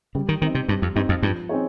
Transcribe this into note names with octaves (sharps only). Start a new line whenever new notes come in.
C#3 G3
D#3
D#3 C4 D#4
C3
G2 G3
F2
G2 C4 D#4
F2
G2 F3
C4 D#4 G#4 C#5